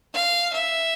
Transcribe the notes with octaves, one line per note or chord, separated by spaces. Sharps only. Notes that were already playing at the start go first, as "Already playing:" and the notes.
F5
E5